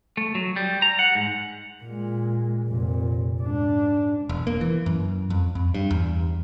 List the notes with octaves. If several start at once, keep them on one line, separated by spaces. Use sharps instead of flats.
A3
F#3
G3
A#5
F#5
G#2
A#2 G#3
F1 A#2
G#2 D4
E1
A#3
E3
F#2
F2
F2
G2
E2